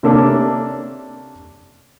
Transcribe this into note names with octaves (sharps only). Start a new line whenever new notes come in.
C3 A#3 C#4 D4 A4